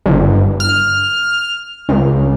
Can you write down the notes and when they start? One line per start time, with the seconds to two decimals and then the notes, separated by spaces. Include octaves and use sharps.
0.06 G1
0.60 F6
1.89 C#2